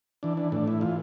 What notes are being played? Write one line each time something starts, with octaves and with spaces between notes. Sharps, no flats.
E3 D4
D4
A2 D4
E4
E3 F4